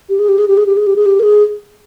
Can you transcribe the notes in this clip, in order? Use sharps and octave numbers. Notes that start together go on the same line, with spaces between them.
G4
G#4
G4
G#4
G4
G#4
G4
G#4
G4
G#4
G4
A#4
G#4